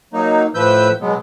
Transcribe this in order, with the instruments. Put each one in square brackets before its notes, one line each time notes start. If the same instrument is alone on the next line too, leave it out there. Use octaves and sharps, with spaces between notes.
[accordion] F#3 A#3 D#4
A2 F3 B4 E6 G6
B2 F#3 G#3 B3